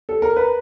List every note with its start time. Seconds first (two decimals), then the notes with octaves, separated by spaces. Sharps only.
0.09 A4
0.22 A#4
0.36 B4